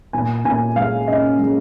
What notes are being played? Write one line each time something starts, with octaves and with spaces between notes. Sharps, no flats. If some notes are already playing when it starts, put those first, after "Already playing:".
A#2 G#5
A#2 G#5
G#3 F5
C#4 D#5
G#3